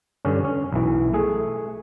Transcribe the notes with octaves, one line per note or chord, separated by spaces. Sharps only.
G2 D3 C#4
C#4
B1 E3
A3 G#4